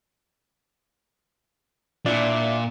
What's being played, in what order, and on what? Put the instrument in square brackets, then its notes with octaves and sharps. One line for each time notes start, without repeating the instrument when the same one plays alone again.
[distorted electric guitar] A#2 [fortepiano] D4 E4 [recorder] E5